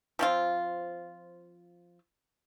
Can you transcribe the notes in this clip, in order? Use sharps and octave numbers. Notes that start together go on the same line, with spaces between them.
F3 C4 F4